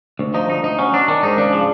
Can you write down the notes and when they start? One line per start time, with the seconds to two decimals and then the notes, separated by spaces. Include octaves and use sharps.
0.19 D2
0.34 F3 D#4
0.49 D2 D#4
0.64 D2 D#4
0.79 F#3 C#4
0.93 F#3 D4
1.08 D#3 D4
1.23 G#2 D#4
1.38 C#3 D4
1.53 F3